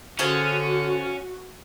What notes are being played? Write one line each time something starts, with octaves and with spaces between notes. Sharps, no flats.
D3 C#4 F4 F#4 G#4 C5